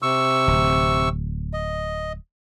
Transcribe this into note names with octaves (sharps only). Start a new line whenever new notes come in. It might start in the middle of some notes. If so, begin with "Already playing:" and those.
C3 C#6 E6
D1
D#5